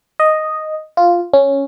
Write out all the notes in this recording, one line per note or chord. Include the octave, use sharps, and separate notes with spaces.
D#5
F4
C#4